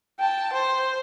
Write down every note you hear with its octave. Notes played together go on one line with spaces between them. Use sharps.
G5 A5
C5